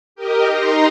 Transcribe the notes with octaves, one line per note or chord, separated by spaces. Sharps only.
G4 A#4 D#5
D#4 A#5 C6